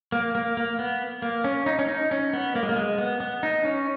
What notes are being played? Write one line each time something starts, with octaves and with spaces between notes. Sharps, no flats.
A#3
A#3
A#3
B3
A#3
C#4
D#4
C#4
D#4
C#4
B3
A#3
G#3
A#3
G#3
B3
B3
D#4
C#4